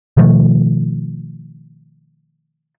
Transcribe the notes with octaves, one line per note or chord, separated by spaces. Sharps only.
B2 D#3 F3 A3